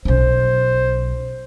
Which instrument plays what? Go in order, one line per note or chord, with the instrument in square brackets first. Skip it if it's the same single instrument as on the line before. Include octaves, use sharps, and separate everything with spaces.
[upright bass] B1 C#4 [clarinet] C5